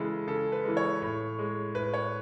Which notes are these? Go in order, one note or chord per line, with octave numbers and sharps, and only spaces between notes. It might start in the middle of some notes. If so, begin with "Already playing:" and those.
Already playing: C#3 E3 G#3 A4
C#3 A4
B4
E3 G#3
C#5
A2
G#3
A2 B4
C#5